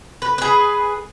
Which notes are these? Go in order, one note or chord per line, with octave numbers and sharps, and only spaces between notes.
B4
G#4 B4